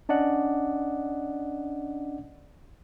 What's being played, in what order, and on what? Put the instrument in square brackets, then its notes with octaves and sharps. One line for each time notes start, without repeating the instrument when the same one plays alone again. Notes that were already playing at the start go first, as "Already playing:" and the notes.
[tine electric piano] C#4 D4 D5 D#5 F#5